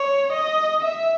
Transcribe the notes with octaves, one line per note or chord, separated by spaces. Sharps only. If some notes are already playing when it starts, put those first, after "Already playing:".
Already playing: C#5
D#5
E5